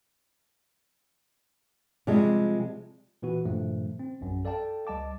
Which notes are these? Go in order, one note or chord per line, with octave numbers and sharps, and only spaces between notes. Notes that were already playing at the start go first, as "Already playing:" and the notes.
C3 F3 G3 G#3
A#2 E3 B3 F#4
G2 A#2 D#3 F3 A3
C4
A#1 F#2
A4 D5 F5 G5 A5
C#2 G3 D#5 A5 D6